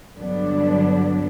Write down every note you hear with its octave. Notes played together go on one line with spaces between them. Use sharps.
G2 D3 F#3 B3 D4